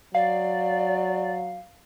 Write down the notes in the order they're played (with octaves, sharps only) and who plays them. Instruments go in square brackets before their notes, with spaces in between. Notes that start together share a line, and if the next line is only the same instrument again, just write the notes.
[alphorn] F#3 [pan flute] D5 [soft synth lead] F5